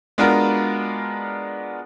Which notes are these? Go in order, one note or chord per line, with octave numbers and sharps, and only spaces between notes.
G#3 B3 D4 F4 F#4 A#4